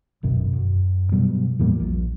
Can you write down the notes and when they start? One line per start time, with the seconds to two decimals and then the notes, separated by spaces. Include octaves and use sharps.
0.23 D1 G#1 F#2 B2
0.53 F#2
1.12 G2 B2 F#3 G3
1.59 E2 A2 G3 A#3
1.80 A#1